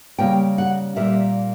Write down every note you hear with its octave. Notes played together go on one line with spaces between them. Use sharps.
C#3 G3 A#3 G5
F#5
A#2 G3 A#3 E5